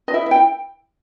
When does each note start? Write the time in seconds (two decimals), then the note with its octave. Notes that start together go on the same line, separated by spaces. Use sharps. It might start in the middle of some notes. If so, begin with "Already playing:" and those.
0.08 D#5
0.14 E4 E5
0.26 E5
0.31 G5